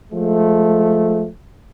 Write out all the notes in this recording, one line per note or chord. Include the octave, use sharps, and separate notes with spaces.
F3 G#3 A3